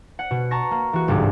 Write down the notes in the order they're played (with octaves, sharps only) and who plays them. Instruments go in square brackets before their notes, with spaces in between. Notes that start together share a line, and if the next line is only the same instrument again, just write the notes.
[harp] F#5
B2
A5 A#5 C#6 A#6
A#3
E3 F#4
G1 C2 G#2 D6